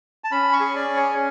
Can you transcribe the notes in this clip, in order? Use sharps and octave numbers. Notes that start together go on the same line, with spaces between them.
A5
C#4 B5
C#6
G#4
D5
C#4
C#5